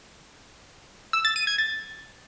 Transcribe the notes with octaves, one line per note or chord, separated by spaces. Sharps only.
E6
A6
D#7
G#6
A6